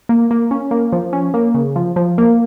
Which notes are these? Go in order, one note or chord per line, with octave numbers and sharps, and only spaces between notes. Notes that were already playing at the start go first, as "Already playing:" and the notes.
A#3
A#3
C#4
A#3
F3
C#4
A#3
C#3
F3
F3
A#3